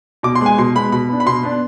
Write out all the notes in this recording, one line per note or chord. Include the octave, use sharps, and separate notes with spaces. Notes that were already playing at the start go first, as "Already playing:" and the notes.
B2 D6
C6
G#3 B3 G#5
B2 C6
G#3 B3 B5
B2 B5
B3 D4
B5
B2 C6
B3 D4